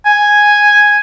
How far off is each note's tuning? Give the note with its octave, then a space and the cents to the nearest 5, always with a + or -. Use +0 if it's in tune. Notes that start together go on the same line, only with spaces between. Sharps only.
G#5 +0